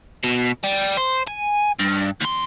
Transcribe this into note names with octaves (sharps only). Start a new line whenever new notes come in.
B2
G3
C5
G#5
G2
D#2 C6